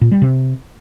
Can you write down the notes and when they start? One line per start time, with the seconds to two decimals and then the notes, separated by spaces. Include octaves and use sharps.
0.01 A#2
0.12 G3
0.22 C3